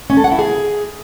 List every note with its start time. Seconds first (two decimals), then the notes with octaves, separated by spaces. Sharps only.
0.10 C#4
0.17 A4
0.24 F#5
0.31 E4
0.39 G#4